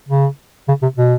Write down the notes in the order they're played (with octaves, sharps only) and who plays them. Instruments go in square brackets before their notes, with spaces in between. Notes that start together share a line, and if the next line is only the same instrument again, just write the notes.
[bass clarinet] C#3
C#3
C3
B2